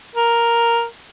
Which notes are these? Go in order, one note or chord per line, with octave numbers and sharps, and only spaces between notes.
A#4